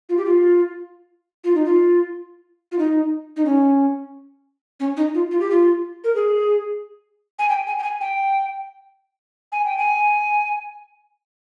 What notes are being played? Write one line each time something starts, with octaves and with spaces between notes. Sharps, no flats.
F4
G4
F4
F4
D#4
F4
F4
D#4
D#4
C#4
C#4
D#4
F4
F4
G4
F4
A#4
G#4
G#5
G5
G#5
G5
G#5
G5
G#5
G5
G#5